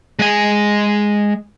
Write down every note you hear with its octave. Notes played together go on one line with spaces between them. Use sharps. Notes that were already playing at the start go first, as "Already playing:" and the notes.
G#3 G#5